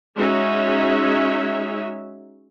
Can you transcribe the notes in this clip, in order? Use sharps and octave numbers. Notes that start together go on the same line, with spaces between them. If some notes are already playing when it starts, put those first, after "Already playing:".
G#3 C#4 D#4 F#4 C#5 E5